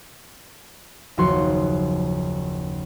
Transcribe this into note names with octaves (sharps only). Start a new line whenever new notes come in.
F#1 D#2 F3 F#4 C6 C#7